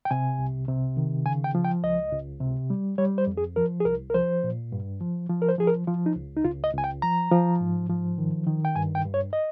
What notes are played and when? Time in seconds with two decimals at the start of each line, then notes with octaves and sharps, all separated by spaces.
0.05 G5
0.11 C3 G#5
0.39 C2
0.68 C3
0.97 D#3
1.26 C#3 G#5
1.44 G5
1.55 F3
1.64 G5
1.83 C#2 D#5
2.13 C#2
2.40 C3
2.70 G3
2.98 G3 C#5
3.18 C5
3.27 F2
3.37 G#4
3.56 F3 A#4
3.80 G#4
3.85 C2 A#4
4.10 A#4
4.14 F3 C5
4.44 A#2
4.72 G2
5.01 F3
5.29 F3
5.42 A#4
5.48 C5
5.58 F3 G#4
5.67 A#4
5.87 F3 F4
6.06 D#4
6.16 C#2
6.36 D#4
6.44 C#2 F4
6.64 D#5
6.74 C#2 G#5
6.84 G5
7.02 F3 A#5
7.31 F3
7.61 G#2
7.89 F3
8.18 D#3
8.47 D#3
8.65 G5
8.76 G2 G#5
8.95 G5
9.05 G2
9.14 C#5
9.33 D#5